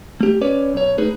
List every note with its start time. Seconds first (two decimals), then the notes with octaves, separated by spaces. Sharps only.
0.21 A3 G4
0.42 C#4 B4 C#5 D5
0.74 B1 C#5
0.98 A3 D#4 G#4 B4